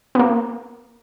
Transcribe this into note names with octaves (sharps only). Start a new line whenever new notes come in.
B3
A#3